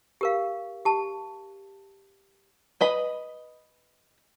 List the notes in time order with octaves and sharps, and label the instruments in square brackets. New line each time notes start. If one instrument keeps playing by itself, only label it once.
[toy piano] G4 A#4 F5
G4 A5
[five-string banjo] B4 D#5 B5